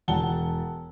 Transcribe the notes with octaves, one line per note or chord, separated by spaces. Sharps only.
E1 F#5 A5 G7